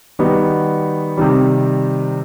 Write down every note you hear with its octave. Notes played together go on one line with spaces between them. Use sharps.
D#3 G3 B3 D#4 F#4
C3 D#3 G3